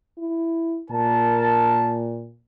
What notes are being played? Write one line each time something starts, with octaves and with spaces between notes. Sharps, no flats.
E4
A#2 A#4 A5